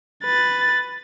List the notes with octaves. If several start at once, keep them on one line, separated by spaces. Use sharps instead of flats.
B4 A6